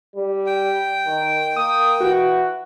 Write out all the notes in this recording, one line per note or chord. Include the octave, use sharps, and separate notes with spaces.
G3
G5
D#3
A#3 D#6
E3 F#4